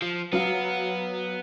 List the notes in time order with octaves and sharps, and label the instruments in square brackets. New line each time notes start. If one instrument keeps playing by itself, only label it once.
[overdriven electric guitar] F3
[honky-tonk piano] F#3 F5 [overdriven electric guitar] B3